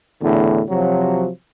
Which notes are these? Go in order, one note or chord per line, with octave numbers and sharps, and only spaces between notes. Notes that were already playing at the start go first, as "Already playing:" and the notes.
E2 A2 D3
C3 F3 F#3